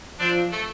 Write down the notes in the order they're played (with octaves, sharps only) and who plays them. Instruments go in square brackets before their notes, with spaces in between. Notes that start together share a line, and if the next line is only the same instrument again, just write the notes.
[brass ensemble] F3 [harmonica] C4 D4
[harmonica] A3